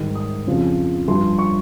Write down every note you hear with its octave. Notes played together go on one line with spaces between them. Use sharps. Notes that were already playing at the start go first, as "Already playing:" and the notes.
Already playing: G#2 D#3 G3
D#6
F2 C#3 F3
G2 F3 C6
C#6